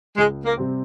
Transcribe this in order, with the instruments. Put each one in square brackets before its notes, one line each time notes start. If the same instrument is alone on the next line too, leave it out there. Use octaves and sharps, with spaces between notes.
[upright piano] C#2 [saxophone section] G#3
[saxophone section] A#3
[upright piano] C3 G3 C4